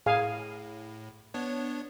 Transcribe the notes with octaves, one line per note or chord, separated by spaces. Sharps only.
A2 G#4 F5 G#5
B3 D4 C#5